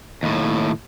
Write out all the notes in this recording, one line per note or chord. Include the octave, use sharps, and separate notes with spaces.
D#2 A2